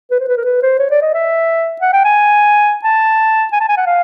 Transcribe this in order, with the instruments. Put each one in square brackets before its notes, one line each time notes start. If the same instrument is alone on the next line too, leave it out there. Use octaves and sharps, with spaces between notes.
[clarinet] B4
C5
B4
A#4
B4
C5
C#5
D5
D#5
E5
F#5
G5
G#5
A5
G#5
A5
G#5
F#5
F5